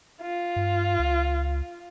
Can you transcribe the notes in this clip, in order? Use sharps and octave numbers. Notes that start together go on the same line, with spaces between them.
F4
G2
C#2